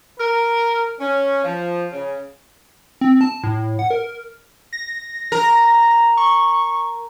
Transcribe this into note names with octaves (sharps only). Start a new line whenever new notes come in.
A#4
C#4
F3
C#3
C4
A5
A2
F#5
A#4
A#6
A#4
C#6